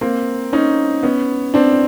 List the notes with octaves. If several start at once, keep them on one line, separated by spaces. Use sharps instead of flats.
A#3 C4
C#4 D#4
B3 C#4
C4 D4